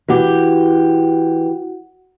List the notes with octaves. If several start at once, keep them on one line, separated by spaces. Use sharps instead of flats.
E3 F#4 G4 F#5